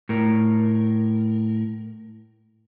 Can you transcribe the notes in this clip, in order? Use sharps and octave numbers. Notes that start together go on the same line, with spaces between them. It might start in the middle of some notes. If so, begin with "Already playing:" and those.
A2 A#4